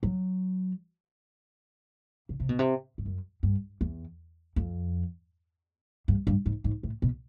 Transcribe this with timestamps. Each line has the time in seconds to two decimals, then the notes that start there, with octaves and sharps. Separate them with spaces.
0.03 F#3
2.29 C#3
2.40 C3
2.49 B2
2.59 C3
2.98 G2
3.06 F#2
3.43 G2
3.81 E2
4.56 F2
6.08 G2
6.27 G2
6.46 G#2
6.64 G#2
6.83 A2
7.02 B2